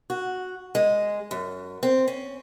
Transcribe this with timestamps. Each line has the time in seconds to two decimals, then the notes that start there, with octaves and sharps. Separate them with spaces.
0.10 F#4
0.75 G#3
1.31 F#2
1.83 C4
2.08 C#4